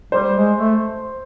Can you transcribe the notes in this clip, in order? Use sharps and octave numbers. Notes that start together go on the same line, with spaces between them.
G3 C5
G#3
A3